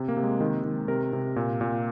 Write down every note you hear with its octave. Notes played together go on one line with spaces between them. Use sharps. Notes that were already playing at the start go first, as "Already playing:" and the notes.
Already playing: C3
A#3
C3
G#3
D#3 G#3
D#3
C3 A#4
C3
A#2
A#2